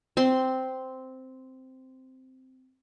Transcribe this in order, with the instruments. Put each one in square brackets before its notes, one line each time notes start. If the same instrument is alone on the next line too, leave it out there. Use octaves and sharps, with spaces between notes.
[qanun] C4 C6